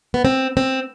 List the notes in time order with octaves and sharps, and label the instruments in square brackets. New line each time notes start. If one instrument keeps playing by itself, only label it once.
[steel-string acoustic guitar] B3
C4
C4